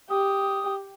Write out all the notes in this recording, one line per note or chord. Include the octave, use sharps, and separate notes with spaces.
G4 D#6